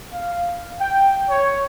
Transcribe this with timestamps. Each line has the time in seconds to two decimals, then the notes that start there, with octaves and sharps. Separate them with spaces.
0.12 F5
0.79 G5
1.28 C#5